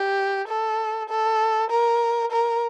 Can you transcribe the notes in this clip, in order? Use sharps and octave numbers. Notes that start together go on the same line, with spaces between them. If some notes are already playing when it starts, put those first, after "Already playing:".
Already playing: G4
A4
A4
A#4
A#4